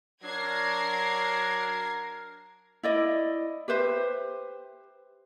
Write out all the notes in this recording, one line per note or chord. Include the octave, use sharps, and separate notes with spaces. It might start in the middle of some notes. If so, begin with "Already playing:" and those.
F#3 D4 A#4 G#6 A#6 C7
E4 D5 D#5
G4 B4 C5 E5